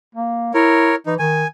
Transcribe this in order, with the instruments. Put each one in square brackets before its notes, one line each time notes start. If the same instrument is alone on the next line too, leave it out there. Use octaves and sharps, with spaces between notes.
[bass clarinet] A#3
[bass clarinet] E4 [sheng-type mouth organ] A#4 C#5
[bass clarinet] E3 [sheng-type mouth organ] D#4
[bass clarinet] D#3 [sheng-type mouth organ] G#5